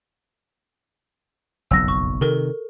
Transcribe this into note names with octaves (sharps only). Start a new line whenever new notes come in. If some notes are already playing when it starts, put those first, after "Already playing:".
F#1 B1 F2 E6 A#6
C#6
C3 D#3 A4 A#4